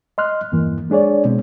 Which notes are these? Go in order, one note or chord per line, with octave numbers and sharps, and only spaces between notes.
D#5 C6 F6 F#6
E2 G2 E3 A#3
G#3 D4 G#4 C#5 D5
B2 G#3 C4